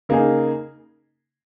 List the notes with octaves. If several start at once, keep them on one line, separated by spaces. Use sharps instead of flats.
C#3 A#3 D#4 G#4